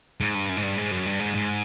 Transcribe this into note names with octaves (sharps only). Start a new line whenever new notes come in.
G#2
G2
F#2
G#2
G2
G#2
F#2
G2
G#2
G#2